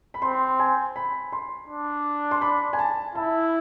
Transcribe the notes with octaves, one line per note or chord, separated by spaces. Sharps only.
B5
C4 C6
G#5
B5
C6
D4
C6
B5
G#5
A5
E4 A5